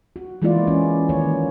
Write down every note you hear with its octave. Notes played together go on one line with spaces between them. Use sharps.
F#4
E3 G#3 A#3 E4 F4 D5
C#4
D#3 A#3 C#5